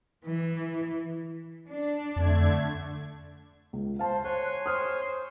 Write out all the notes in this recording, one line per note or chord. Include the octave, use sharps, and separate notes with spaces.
E3
D4
F2 D3 A3 G#6
C#2
C5 F5 A5
C5 C#5 G#5 C6 F#6
C5 D#6 F6